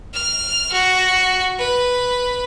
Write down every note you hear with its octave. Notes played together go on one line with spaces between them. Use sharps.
F6
F#4
B4